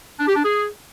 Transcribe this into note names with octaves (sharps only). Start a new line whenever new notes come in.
D4
G4
D4
G#4